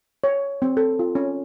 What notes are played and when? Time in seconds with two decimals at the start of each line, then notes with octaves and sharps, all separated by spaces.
0.24 C#5
0.62 C4
0.77 A4
0.99 F4
1.15 C#4